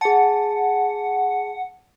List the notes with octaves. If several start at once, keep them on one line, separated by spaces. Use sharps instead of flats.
G#4 F#5 A5